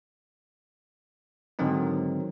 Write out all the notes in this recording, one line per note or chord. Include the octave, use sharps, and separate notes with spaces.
G#2 D3 D#3 F#3 C4 D#4